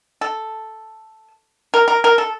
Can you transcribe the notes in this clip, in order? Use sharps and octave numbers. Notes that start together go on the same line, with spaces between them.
A4
A#4
A#4
A#4
A4